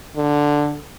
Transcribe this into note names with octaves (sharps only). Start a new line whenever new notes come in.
D3